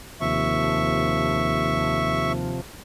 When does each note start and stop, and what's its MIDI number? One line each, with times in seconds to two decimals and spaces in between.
0.21 2.62 39
0.21 2.61 48
0.21 2.61 53
0.21 2.32 76
0.21 2.32 85